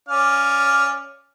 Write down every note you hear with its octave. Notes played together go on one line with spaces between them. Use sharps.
C#4 D5 F5